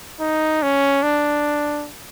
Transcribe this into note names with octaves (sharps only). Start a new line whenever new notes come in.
D#4
C#4
D4